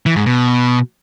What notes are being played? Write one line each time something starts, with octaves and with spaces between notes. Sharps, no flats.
E3
G#2
B2